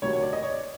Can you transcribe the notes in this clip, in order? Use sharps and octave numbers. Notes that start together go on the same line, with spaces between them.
D2 C3 D#3 F#3 C#5
C#5
D5
D#5
C#5
D5